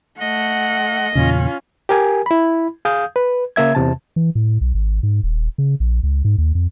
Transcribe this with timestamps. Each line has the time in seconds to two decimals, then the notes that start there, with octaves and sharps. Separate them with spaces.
0.20 A3 D#5 F#5
1.15 E2 A#2 C#3 C#4 F4
1.89 G4 A#4 G#5
2.26 E4 B5
2.85 G#4 F5 D#6 G6
3.16 B4
3.56 C#3 A#3 E5 G#6
3.75 E2 C3 A5
4.16 E3
4.35 A2
4.61 B1
4.74 G#1
5.03 G#2
5.23 D#1
5.58 C#3
5.80 A#1
6.03 C#2
6.25 G#2
6.38 D#2
6.55 F2